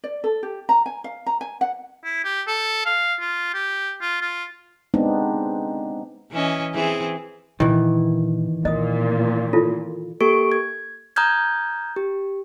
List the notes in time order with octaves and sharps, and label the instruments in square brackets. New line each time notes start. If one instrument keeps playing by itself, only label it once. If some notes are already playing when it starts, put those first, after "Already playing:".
[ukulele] D5
A4
G4
A#5
G#5
F5
A#5
G#5
F#5
[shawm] E4
G4
A4
F5
F4
G4
F4
F4
[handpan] G#3 B3 C4 D4 D#4
[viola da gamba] E3 C#4 D#5
E3 C4 G#4
[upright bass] A#2 [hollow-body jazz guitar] D#3 E3
[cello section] A#2 [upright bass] C4 [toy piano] D#5 D#6
[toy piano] E4 F4 A4
[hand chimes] A#3 G4 A4 C#6 D7
G#6
A#5 D#6 F6 G6 G#6
G4